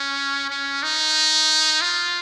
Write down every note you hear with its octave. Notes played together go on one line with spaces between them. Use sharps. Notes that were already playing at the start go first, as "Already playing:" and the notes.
Already playing: C#4
C#4
D#4
F4